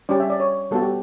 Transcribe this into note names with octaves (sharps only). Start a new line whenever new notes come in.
G3 C#4 G4 D5
E5
D5
C#5
G3 B3 F#4 A4
G4